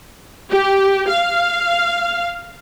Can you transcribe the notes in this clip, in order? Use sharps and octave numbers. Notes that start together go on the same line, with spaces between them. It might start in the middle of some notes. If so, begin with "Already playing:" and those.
G4
F5